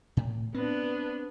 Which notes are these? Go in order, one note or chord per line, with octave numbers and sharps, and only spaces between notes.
A2
B3 C4 D4